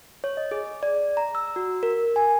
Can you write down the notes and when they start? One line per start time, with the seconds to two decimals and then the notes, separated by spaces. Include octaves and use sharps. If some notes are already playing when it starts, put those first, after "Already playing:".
0.24 C#5
0.37 D#5
0.51 G#4
0.83 D5
1.17 A#5
1.35 E6
1.56 F#4
1.83 A#4
2.16 G#5